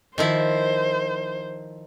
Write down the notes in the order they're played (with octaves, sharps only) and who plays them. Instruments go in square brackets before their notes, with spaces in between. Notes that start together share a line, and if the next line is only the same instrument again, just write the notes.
[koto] D#3 F3 E4 [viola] C5